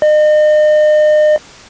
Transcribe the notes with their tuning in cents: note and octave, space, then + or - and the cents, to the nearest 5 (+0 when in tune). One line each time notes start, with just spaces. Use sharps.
D#5 -40